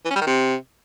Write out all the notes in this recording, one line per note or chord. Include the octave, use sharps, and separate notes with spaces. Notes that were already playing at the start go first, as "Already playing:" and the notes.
E3
C#4
G3
D#3
C3